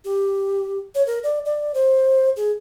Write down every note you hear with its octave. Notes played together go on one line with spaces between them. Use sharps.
G4
C#5
A#4
D5
D5
C5
G#4